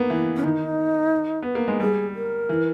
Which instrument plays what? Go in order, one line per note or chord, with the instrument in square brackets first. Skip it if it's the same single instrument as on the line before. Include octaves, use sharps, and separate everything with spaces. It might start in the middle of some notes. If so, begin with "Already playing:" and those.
Already playing: [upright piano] A#3 B3
E3
[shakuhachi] C#4
[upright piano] D#3 [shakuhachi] D#4
[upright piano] B3
A#3
G#3
[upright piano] G3 [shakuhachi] G#4
[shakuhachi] A#4
[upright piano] E3